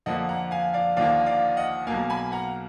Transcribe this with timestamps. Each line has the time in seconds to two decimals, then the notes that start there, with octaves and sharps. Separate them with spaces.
0.06 F2 D3 F3 A#3 D#5 F#5
0.29 F#5 A#5
0.51 F5 G#5
0.74 D5 F5
0.96 D#2 D3 F3 A#3 D5 F5
1.26 D5 F5
1.57 D#5 F#5
1.87 B1 B2 A#3 F5 G#5
2.10 G#5 B5
2.32 F#5 A#5